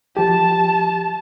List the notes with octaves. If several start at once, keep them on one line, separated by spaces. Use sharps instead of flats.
F3 G4 A5